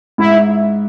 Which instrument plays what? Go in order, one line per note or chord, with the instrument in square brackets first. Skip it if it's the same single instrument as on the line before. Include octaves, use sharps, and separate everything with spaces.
[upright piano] G#2 [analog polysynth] E4